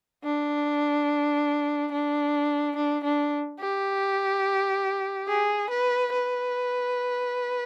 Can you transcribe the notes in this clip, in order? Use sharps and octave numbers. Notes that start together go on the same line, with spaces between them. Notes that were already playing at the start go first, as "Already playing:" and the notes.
D4
D4
D4
D4
G4
G#4
B4
B4